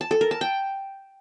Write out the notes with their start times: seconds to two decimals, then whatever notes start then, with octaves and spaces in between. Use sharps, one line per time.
0.01 A5
0.11 A4
0.21 A#4
0.31 A5
0.41 G5